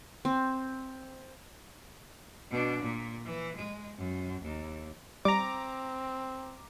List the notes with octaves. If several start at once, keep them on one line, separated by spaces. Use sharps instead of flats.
C4
B2 D4
A#2
E3
G#3
F#2
D#2
G3 C4 A#5 D6